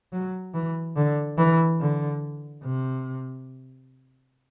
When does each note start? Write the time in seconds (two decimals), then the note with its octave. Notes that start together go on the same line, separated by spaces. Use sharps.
0.13 F#3
0.54 E3
0.96 D3
1.38 E3
1.80 D3
2.64 C3